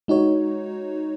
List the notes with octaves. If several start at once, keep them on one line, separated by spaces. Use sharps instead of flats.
G#3 D#4 F#4 C#5